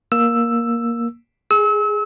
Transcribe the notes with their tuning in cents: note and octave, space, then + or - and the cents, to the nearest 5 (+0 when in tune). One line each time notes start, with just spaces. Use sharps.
A#3 +10 E6 +5
G#4 +0 E6 -35